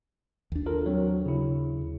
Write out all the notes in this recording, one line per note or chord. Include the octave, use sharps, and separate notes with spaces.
D#2 D4
F4 A4 A#4
F#3 C4
C#3 E4